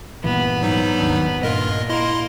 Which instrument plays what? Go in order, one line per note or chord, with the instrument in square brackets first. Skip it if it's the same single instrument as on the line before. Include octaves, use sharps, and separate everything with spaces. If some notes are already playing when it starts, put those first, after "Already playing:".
[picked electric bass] G2 A#2 E3 [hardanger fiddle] B3
[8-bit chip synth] G#2 F#3 D#4
[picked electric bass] D#2 D#3 D4
[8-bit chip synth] G2 A#4 D#5 [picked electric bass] A#2 [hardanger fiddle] F4
[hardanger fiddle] A#3 A#4 [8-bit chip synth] E4 D#5 C6